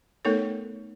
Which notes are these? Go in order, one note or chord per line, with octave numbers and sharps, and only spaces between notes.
A3 B3 D#4 A4 A#4 C#5